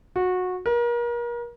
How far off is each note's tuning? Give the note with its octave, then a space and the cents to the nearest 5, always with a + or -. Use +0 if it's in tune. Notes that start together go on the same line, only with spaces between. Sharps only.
F#4 -20
A#4 +35